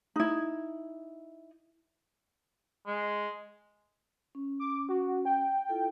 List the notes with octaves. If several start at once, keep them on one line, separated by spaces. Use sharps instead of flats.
D#4 E4
G#3
C#4
D6
F#4
G5
E4 F4 A4